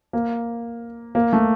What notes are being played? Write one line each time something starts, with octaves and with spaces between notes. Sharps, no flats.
A#3
A#3
A3